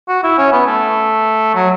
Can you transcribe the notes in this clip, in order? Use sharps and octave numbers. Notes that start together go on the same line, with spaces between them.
F#4
E4
C#4
B3
A3
F#3